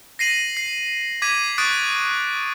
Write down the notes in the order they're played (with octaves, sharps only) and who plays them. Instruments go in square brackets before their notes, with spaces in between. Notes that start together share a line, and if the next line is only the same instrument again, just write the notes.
[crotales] A#6 C7 D#7 F#7
C7
D6 G#6 B6 D#7
C#6 D#6 F#6 A6 D7